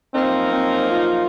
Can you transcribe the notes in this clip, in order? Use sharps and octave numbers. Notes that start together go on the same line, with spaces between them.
F#2 F3 A#3 C4 D#4 A#4
C4
F4